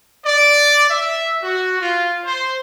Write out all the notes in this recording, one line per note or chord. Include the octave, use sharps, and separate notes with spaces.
D5
E5
F#4
F4
C5